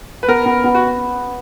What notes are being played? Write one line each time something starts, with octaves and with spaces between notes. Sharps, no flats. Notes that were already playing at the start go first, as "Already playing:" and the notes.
B4
B3 A#4
B3
B3
F#4